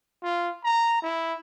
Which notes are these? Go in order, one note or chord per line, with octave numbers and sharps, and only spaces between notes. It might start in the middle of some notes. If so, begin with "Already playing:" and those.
F4
A#5
E4